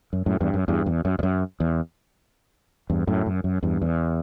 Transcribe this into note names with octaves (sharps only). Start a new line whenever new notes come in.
F#2
F#2 A2
E2 G2
F#2
E2 G2
E2
F#2
E2
F#2
E2
E2 G2
F#2 A2
F#2
F#2
E2 G2
E2